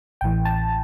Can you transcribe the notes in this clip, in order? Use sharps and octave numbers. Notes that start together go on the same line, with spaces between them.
A1 A2 E3 G5
A5